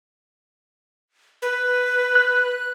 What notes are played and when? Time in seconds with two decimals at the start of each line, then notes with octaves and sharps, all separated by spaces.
1.42 B4
2.15 F#6